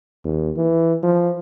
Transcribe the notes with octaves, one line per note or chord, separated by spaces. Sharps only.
D#2
E3
F3